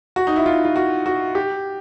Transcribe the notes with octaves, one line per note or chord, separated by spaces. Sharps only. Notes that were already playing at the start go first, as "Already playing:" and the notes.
F#4
D#4
E4
F4
F4
F#4
F#4
G4